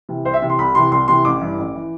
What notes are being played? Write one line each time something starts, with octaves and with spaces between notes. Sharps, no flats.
C3 E3
C2 C5
E5
C3 E3
C6
C2 B5
C3 E3 C6
C2 C6
C3 E3 C6
A1 D6
G2 E3
A1
E3